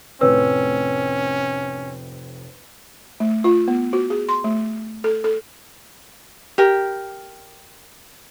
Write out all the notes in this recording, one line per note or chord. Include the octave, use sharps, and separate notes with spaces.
F1 A2 C4 C#4 B4 C#5 E6
A3
F4
B3
F#4
G#4
C6
A3
A4
A4
G4 A#4